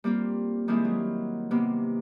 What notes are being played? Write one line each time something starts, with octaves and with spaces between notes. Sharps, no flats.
G3 A#3 C4 F4
D#3 G3 G#3 A#3 C4 E4
F#3
C3 A#3 B3